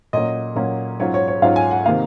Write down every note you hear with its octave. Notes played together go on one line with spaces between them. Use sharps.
A#2 F#3 A#3 C#4 D#5
A#2 F#3 A#3 C#4
G#2 F#3 C#4 F4 C#5
C#5
C#5
G#2 F#3 C#4 F4 F5
G#5
F#5
C3 D#3 A#3 D#4 F5